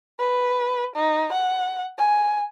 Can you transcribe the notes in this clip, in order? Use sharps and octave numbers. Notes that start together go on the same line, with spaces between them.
B4
D#4
F#5
G#5